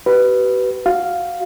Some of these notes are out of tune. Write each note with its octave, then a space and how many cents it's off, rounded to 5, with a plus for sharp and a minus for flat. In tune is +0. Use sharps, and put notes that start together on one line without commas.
G4 -45 B4 +0
F#4 -5 F5 +0